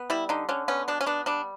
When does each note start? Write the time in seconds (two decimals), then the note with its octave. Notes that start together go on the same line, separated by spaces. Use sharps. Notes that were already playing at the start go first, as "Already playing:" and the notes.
Already playing: B3
0.10 G3 E4
0.29 D3 D#4
0.49 D3 C#4
0.68 B3 C#4
0.88 B2 D4
1.01 C#4
1.06 B3 D4
1.26 G3 D4